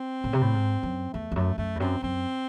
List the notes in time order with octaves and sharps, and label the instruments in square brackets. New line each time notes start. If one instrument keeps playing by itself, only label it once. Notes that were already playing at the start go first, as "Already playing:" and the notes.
Already playing: [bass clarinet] C4
[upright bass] A2
C3
A2
G#2
F#2
[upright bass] E2 [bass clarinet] A3
[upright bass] E2
[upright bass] F#2 [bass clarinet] A3
[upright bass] F#2 [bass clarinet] A3
[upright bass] E2
[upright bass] F#2 [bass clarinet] C4
[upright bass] F#2 [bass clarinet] C4